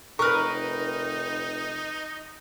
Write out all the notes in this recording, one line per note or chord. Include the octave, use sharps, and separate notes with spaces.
F1 D#4 A#4 B4 C#6 F6